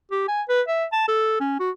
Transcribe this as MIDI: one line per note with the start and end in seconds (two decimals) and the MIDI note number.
0.11 0.24 67
0.28 0.42 80
0.49 0.62 71
0.68 0.85 76
0.92 1.05 81
1.08 1.40 69
1.40 1.56 61
1.60 1.70 66